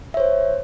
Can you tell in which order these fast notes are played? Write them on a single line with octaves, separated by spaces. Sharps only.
E5 C#5 C5